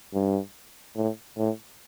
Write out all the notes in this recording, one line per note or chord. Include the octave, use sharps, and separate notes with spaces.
G2
A2
A2